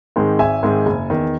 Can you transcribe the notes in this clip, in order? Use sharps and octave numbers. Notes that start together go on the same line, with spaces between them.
G#2 D#3 G#3 C4
G#1 E5 G#5
G#2 D#3 G#3 C4
F#1
E2 D#3